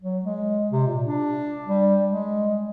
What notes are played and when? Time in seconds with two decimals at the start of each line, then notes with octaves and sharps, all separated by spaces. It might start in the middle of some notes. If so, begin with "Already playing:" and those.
0.02 F#3
0.24 G#3
0.71 C3
0.86 A#2
1.06 D4
1.66 G3
2.08 G#3